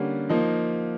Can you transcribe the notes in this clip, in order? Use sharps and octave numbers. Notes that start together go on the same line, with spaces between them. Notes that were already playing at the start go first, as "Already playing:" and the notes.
Already playing: D3 G3 A#3 C#4
F3 A#3 D#4